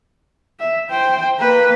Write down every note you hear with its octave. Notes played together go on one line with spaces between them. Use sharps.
E5
C5 G5
A#3 B4